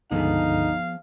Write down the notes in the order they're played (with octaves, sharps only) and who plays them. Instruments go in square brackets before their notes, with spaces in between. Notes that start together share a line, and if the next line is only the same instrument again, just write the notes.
[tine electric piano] C#2 G2 D3 [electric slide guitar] F3 B3 G#4 [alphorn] D#4 [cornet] F5